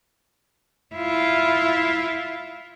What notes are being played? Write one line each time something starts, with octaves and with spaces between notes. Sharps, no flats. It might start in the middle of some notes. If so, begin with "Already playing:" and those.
E4 F4